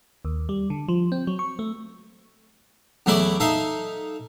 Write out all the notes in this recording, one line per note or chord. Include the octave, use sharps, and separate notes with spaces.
D#2
G3
D3
F3
C4
F#3
C#6
A3
E2 F#3 A3 E4 D5 D6
D#4 A4 E5 F5